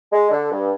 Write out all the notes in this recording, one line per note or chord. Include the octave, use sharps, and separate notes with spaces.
G#3
D3
G2